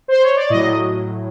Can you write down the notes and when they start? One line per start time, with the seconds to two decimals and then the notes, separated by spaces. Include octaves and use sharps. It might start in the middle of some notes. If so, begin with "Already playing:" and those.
0.08 C5
0.23 C#5
0.36 D5
0.50 A2 F#3 D#5